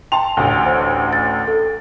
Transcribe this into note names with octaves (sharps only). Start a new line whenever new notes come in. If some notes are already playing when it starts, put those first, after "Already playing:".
G5 A5 C6 F7
A1 D2
C5
A6
A4